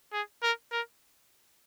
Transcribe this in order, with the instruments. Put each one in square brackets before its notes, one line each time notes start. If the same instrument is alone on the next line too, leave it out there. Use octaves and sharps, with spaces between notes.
[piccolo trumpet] G#4
A#4
A#4